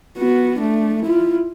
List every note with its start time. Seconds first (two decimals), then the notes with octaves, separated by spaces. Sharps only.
0.18 B3 F#4
0.59 A3 D4
1.03 E4 F4